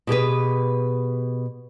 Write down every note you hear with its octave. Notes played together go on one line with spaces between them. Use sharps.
B2 G4 G#4 B4